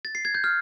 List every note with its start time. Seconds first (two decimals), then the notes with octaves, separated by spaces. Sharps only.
0.05 A6
0.15 C7
0.25 G#6
0.35 G6
0.44 F6